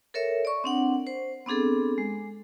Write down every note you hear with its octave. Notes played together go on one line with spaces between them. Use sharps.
A4 A#4 C#5 E5
D5 C#6
C4 D4 F#5
C5
B3 C4 D4 G#4 A4
G#3